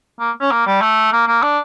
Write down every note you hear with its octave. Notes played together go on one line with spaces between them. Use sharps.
A#3
C#4
A#3
G3
A3
A#3
A#3
D4